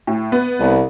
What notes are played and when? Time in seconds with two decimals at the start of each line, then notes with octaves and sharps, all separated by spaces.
0.07 A2
0.32 B3
0.59 C2